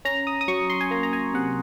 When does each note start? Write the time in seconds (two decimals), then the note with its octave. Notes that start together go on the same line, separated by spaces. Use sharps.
0.05 C#4 A#5
0.27 D#6
0.41 D#6
0.48 F#3 C#6
0.70 C6
0.81 G#5
0.91 A#3 A#5
1.03 A#5
1.13 G#5
1.34 C3 F#5